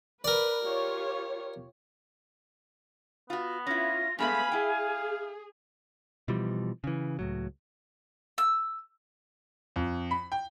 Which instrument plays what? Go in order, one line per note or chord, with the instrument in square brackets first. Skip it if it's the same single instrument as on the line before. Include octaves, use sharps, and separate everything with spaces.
[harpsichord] A#4 D5 [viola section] B4
[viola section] F4 G4 C#5
[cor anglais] B3 [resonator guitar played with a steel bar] F4 F#4
[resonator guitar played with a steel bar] C#4 E4 [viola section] F4 [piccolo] A#6
[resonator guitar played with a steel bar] G2 G#3 A3 [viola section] B3 B5 [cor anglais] F5 [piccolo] G#5
[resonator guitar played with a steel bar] E4 G5 [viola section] G#4
[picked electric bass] B2 E3 F3 G3
C#3 E3
C#2 A2 F#3
[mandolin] E6
[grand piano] F2
B5
G5